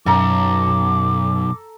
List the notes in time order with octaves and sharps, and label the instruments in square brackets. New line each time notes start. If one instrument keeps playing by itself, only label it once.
[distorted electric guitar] B1 [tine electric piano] F#2 [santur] A4 A#5 [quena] D6